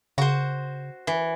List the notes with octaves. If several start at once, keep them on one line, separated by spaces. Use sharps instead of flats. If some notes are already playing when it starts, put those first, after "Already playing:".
C#3 F#4 C5
E3